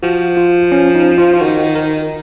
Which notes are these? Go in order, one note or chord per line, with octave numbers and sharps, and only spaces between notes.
F3 F#4
F4
C#4
D#4
F4
F4
D#3 F#4
A#4